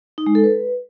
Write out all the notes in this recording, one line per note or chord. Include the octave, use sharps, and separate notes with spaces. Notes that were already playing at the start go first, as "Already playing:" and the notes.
D#4
G#3
A4
B4